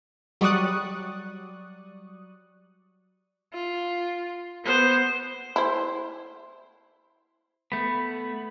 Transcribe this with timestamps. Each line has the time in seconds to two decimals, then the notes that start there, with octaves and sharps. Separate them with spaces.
0.41 F#3 G3 D5 C#6 D#6 F#6
3.54 F4
4.65 B3 C5
5.56 E4 C5
7.72 A3 B3 B5